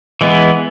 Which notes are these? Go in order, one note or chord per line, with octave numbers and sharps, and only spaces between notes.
E3 G#3 B3